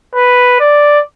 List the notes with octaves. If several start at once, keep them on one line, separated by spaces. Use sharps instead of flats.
B4
D5